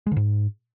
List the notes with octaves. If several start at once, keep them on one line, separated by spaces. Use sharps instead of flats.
G#3
D3
G#2